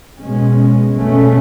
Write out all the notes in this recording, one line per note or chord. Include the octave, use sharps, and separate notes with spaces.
B2 G#3 C#4
B2 A3 C#4